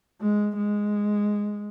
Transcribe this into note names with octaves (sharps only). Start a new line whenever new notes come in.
G#3
G#3